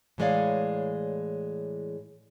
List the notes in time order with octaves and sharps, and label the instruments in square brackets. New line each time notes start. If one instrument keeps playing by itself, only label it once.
[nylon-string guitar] A2 E3 G#3 C#5 D5 F5